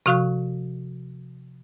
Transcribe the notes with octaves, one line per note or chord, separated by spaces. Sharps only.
C3 F3 F#4 F5 C#6 F#6